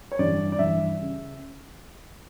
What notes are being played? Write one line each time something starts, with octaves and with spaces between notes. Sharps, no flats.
C#5
G2 E3 D5
D5
G2 E3 E5
C#3